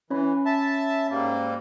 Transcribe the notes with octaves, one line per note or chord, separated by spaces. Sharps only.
E3 C#4 C#5 B5
E5 A5
G#2 G3 A#3